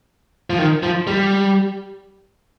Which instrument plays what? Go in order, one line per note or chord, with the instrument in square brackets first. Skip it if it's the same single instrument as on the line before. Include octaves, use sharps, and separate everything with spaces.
[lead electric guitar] F3
D#3
F3
G3